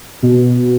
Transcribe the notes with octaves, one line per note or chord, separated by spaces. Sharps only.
B2